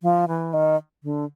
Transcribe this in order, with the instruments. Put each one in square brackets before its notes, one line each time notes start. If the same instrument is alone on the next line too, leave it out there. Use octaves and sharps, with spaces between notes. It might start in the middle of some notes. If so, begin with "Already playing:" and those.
[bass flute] F3
E3
D#3
D3